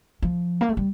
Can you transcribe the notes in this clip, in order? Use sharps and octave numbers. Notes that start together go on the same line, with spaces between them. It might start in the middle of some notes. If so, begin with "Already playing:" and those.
F3
A#3
A3
G3